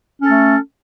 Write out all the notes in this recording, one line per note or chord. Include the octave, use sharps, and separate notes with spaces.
A3 C#4 A4